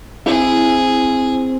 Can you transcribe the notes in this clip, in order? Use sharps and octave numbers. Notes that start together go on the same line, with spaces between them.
C4 E4 G#4